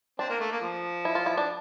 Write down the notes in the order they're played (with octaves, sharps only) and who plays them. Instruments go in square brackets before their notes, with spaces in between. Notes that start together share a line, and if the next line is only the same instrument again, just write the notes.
[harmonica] C4 [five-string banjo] D4
[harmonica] A#3
A3
A#3
F3
[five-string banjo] E4
F4
E4
D4